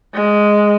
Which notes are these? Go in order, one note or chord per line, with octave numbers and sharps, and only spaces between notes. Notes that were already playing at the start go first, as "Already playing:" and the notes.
G#3